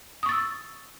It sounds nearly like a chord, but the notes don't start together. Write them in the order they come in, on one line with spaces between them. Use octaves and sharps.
D#6 C#6 A6 E6